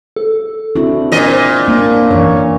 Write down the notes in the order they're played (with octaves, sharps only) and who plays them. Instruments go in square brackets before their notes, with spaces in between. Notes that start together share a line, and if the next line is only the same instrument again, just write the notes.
[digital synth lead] A4
[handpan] C4 D4 E4 [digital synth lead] F#4
[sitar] A#2 D#5 [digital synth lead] B6
[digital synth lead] C5
[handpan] A#3 D4
[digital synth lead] F#2 [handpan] E3 A#4 C#5